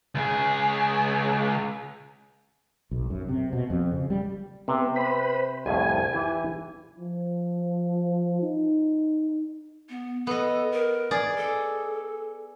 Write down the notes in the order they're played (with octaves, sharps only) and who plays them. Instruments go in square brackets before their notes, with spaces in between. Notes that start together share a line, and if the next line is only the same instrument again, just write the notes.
[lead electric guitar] C#2 G#4
[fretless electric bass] B1
F#2
C3
B2
F2
C#3
G3
[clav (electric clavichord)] C3 [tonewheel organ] B3
[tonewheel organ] B4 C5 B5
[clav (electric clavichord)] C2 F2 A2 [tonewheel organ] G#5
[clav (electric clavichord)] E3 E4 G4
[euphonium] F3
D#4
[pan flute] B3
[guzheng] B3 D#5 [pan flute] A4
[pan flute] A#4
[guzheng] G#4 D5
[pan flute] A4